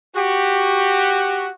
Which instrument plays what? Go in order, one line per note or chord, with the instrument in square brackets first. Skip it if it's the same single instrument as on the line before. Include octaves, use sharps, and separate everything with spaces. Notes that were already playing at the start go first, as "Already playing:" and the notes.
[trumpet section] F#4 G4